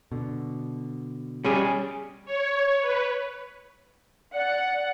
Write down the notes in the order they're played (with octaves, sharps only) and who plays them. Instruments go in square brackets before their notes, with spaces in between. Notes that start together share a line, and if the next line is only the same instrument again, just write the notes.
[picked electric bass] B2 D3
[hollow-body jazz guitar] G3 C#4 G#4
[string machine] C#5
B4
[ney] D5 [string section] F#5